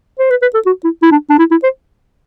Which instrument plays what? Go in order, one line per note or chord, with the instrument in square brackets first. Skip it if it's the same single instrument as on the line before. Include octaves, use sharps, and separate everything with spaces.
[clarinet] C5
B4
B4
A4
F#4
E4
E4
D4
D4
E4
E4
C5